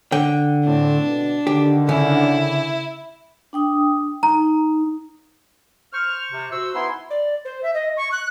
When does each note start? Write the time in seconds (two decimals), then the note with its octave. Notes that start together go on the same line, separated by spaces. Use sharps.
0.12 D3 G5
0.65 A2 C4 D4
1.04 B2
1.47 D3 D#3 G4
1.89 C#3 E4
3.53 D4 G5 D#6
4.23 D#4 A#5
5.93 C5 C#6 F6
6.33 C3
6.52 F#4 C5 E6
6.75 B3 D#4 E4 G#5 C6
7.10 D5
7.45 C5
7.63 E5
7.74 D#5
7.97 C#6
8.12 F#6